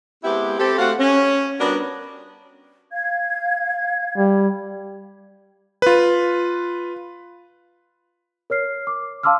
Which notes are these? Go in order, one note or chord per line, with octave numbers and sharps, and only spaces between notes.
G#3 B3 C4 E4 G4
C4 G4 A4
A3 C4 F#4 F5 F#5
C#4
G3 B3 C#4 D4 F#4 A#4
F5 G#6
G3
F4 B4
A#4 C#5 F6 C7
D6
F5 A5 C6 D6 E6 F6